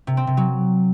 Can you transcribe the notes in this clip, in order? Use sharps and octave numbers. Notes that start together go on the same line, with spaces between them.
C3
C4
C3
F#3